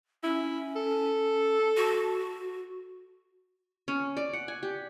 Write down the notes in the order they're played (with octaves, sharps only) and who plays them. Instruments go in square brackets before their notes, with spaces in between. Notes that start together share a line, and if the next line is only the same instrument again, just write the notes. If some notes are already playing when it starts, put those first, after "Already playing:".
[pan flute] C#4 [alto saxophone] E4
[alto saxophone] A4
[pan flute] F#4
[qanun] C#4
D5
F#5
G#5
G4